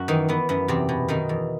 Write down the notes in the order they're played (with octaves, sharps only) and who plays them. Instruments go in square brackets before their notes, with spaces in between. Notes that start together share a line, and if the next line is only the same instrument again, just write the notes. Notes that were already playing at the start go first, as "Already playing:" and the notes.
Already playing: [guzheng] F#2 F#4
D#3 E3 D#4
E3 B3
F#2 B3
E2 C3 C4
B2
B2 D#3 D#4
E2